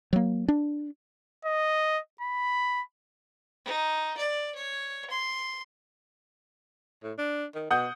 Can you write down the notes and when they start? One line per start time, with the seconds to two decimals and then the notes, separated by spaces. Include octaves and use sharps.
0.13 F#3 A#3
0.48 D4
1.45 D#5
2.21 B5
3.65 D#4
4.17 D5
4.54 C#5
5.10 C6
7.03 A2
7.18 D4
7.54 D#3
7.71 B2 F#5 D#6 G6